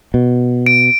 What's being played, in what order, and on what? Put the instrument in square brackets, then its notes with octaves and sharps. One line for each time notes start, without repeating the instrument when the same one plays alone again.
[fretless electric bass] B2
[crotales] D7